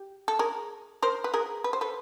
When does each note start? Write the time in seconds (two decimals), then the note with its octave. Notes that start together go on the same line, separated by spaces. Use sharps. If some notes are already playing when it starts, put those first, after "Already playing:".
Already playing: G4
0.28 A4
0.39 G#4 A#4
1.02 A#4 C5
1.24 B4
1.34 G#4 A#4
1.64 B4
1.73 C5
1.81 A4 B4